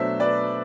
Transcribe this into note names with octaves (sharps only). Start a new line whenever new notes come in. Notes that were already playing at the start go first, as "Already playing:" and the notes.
Already playing: B2 F#3 A3 D4 C5 E5
B4 D5